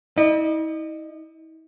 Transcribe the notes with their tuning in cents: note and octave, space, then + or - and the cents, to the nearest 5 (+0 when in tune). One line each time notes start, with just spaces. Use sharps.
E4 -45 D#5 -35